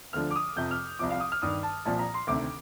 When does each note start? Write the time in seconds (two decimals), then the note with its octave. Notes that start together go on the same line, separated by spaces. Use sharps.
0.13 D2 D3 F3 F6
0.31 D6
0.36 D#6
0.56 F2 C3 F3 G6
0.71 F6
0.99 C2 C3 F3 D6
1.11 F5
1.20 D#6
1.32 F6
1.42 G2 D#3 D#6
1.63 A5
1.85 C2 A#2 F3 A5
1.99 A#5
2.14 C6
2.27 D2 C3 D#3 D6